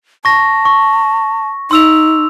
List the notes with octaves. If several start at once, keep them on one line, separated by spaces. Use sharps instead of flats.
A5 C#6 A#6
C#6
D#4 C6 E6 F7